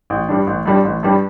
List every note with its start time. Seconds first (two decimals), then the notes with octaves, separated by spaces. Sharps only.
0.10 A1
0.29 G2 G3 D4
0.47 A1
0.65 G2 G3 D4
0.84 A1
1.03 G2 G3 D4